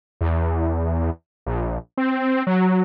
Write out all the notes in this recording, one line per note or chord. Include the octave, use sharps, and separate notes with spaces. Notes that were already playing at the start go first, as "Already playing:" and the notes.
E2
A#1
C4
F#3